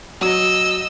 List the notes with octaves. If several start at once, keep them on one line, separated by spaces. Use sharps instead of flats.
F#3 D#5 E6